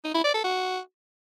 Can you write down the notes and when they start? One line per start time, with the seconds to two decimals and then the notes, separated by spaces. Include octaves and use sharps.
0.04 D#4
0.14 E4
0.24 D5
0.34 A4
0.44 F#4